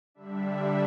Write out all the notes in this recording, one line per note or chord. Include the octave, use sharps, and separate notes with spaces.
D3 G3 D4 E5